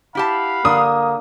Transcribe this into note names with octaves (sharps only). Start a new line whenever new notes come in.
E4 G4 F5 F#5 A5 B5
D3 A#3 D#6